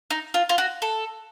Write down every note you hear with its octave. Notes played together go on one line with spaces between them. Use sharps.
D#4
F4
F4
F#4
A4